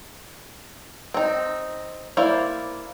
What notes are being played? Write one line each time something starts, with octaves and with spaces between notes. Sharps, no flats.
C4 D#4
A#3 E4 C5 D5 F5